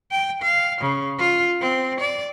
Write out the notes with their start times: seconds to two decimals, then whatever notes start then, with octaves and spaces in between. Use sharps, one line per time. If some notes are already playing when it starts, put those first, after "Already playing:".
0.11 G5
0.42 F5
0.81 C#3
1.19 F4
1.61 C4
2.00 D5